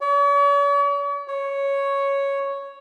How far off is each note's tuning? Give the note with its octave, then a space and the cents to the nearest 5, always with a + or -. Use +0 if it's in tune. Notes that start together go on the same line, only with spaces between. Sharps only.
C#5 +45
C#5 +0